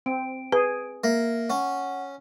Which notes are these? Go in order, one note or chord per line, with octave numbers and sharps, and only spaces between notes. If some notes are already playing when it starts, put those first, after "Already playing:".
C4 D7
G#4 B4
A#3 E5
C#4 F#5